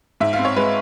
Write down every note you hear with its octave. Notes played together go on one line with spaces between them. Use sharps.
G#2 E5
F5
C4
C#5
G#3 B4